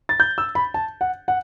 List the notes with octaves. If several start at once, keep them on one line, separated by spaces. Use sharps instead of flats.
A6
G6
E6
B5
A5
F#5
F#5